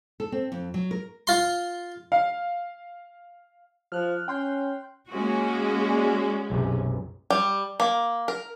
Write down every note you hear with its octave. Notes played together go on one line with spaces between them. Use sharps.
A4
C4
F2
F#3
A#4
F4 C6
F5
F3 F6 F#6
C#4 G5 C6 G6
G#3 A#3 C#4 F#4
D5 G#5
B1 F#2 C3
G3
A#3
A#4